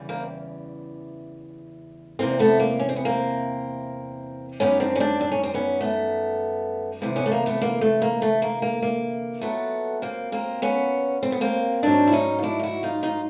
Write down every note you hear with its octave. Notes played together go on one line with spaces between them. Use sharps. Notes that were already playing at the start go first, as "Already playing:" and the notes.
Already playing: E2 C#3 E3 G3
A#3 C4
E2 C3 E3 A#3 C4
A3 B3
A#3
C#4
C4
B3
A#3 C4
F#2 D#3 G3 B3 C#4
C4 D4
C#4
C4 D4
D4
C#4
C4
B3 C#4
A3 B3
D2 C3 E3 G3 A#3 C4
B3 C#4
A3
A#3
A3 B3
A#3
A3
A#3
A3
A#3
A#3
A#3
A#2 F#3 A3 B3
A#3 C4
A#3 C4
B3 C#4
C4
B3
A#3 C4
G#2 D#3 F#3 C4 D4
E4
C#4 D#4
F4
D4 E4
F4
E4 F#4
D#4 F4
D#4 F4